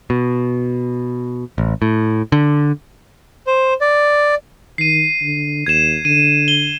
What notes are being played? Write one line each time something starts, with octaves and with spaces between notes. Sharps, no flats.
B2
A1
A2
D3
C5
D5
D#3 C7 D#7
D3
D#2 G#6 E7
D3 D#7
G7